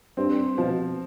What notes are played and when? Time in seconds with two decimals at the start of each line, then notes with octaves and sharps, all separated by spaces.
0.17 G2 C4
0.57 B2 F3